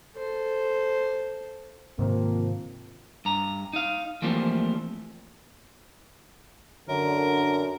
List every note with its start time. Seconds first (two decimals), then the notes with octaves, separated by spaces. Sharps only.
0.16 A4 C5
1.99 G#2 C3 D#3 F3 A#3 C4
3.25 G2 A#5
3.73 D#4 F5
4.22 E3 F3 G3 A3 A#3 C4
6.89 F#2 D3 A#4